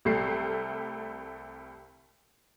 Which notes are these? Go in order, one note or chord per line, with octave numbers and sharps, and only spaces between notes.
C2 G3 A3 C7